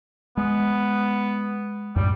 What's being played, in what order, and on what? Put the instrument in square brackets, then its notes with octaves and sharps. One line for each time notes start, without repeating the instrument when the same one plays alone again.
[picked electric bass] G#3 [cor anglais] B3
[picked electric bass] F#2 A2 [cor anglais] G3